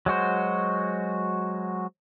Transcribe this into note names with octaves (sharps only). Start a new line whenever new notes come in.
F#3 G#3 F#4 C5